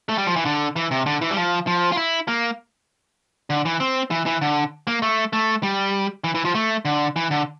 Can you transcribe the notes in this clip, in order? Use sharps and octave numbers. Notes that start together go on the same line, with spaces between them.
A3
G3
F3
E3
D3
E3
C3
D3
E3
G3
F3
F3
F4
E4
A#3
D3
E3
C4
E3
E3
D3
A#3
A3
A3
G3
E3
E3
F3
A3
D3
E3
D3